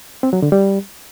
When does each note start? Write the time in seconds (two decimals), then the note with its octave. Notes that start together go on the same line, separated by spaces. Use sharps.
0.23 C4
0.33 F#3
0.42 D3
0.52 G3